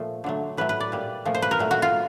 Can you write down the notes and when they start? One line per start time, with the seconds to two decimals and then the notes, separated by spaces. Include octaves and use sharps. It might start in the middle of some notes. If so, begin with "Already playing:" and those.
Already playing: A#2 F3 A3
0.24 D3 F#3 A3
0.57 A2 F#3 A3 B4
0.69 B4
0.80 D5
0.92 A#2 G3
1.25 A#2 F3 A3
1.34 C5
1.42 B4
1.51 A#4
1.59 A#2 F#3 A3
1.71 F#4
1.82 F4